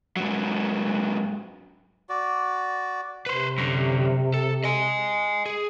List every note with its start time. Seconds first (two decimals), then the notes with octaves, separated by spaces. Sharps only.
0.17 G#2 F#3
2.09 F#4 D5
3.26 C3 B4 C5
3.58 F#2 D3
4.34 A4
4.64 D#5 G#5
5.46 G#4